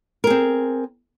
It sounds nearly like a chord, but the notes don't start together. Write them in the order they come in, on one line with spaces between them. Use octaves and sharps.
A#4 G#4 C4